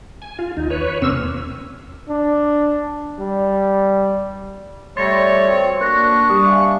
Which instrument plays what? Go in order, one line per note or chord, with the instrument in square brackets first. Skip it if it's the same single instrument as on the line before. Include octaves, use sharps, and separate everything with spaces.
[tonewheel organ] G#5
F4
D#2 D#4
B4 C#5
E2 C3 A#3 C4 C#4 E6
[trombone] D4
G3
[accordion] G3 A3 [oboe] C#5 [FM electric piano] C6 [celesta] A6 A#6
[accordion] C4 [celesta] F#4 C5
[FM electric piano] A#3 [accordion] D4 [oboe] C#6 [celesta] F#6 A#6
[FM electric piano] G3 [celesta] D#6
[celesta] E5 F5 G#5